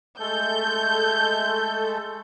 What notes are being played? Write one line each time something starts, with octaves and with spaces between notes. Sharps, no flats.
G#3 A3 A4 G6